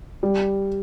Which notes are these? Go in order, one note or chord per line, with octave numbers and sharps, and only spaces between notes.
G3